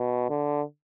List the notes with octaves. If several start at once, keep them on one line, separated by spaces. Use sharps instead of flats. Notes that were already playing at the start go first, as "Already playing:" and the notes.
Already playing: B2
D3